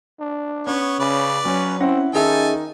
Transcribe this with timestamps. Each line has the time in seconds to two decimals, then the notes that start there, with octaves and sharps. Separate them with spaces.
0.20 D4
0.67 B3 C#4 C#5
0.99 C#3 B4 D5
1.45 F#3 C#4
1.81 C4 C#4 E4 F#5
2.14 D#3 C#4 D#4 G#4 A4 E5 G#5